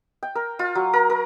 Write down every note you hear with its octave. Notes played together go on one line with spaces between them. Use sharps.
G5
A#4
F4
F#3
A#4
A#4